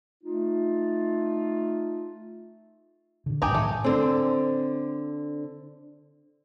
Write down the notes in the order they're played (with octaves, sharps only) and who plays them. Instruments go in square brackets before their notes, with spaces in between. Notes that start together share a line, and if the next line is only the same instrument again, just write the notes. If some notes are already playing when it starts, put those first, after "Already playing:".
[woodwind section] A3 D#4 F4
[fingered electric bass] A#2 D3
[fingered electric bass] C2 G2 [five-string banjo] G4 G#4 A#5
[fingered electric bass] A2 D#3 F#3 [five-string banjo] A3
[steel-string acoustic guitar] D3 C4